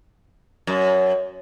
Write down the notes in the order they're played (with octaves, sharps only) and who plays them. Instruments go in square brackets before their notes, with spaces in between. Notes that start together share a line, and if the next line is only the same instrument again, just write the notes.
[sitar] F#2